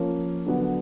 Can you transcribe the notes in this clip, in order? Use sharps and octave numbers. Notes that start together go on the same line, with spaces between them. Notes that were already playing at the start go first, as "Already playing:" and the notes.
Already playing: F3 A#3 C#4
D3 F#3 B3 D4